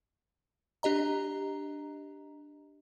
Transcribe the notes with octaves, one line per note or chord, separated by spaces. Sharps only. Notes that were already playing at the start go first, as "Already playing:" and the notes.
D4 G4 D#5 A#5